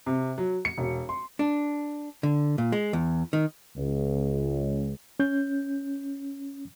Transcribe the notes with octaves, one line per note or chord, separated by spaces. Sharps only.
C3
F#3
C#7
E1
C6
D4
D3
A#2
G#3
E2
D#3
C#2
C#4 G6